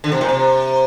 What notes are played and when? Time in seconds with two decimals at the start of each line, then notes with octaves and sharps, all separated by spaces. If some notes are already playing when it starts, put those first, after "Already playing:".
0.04 D3
0.12 C3
0.21 A#2
0.29 C3